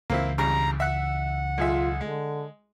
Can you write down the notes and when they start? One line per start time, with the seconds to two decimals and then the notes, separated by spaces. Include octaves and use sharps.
0.10 C#2 E3 A#3 C4 E4
0.38 G#1 C#3 G3 A#5
0.80 E5 F#5 F#6
1.58 B1 F4 G#4 E5
2.01 D3 G#3